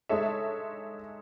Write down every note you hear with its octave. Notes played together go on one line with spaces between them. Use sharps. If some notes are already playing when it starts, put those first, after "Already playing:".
G#3 D#4 A4 C#5 E5